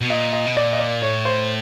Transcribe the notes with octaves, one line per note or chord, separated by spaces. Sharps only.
B2
A#2 D#5
D#5
B2
A#2 D5
D#5
D5
A2 C#5
C5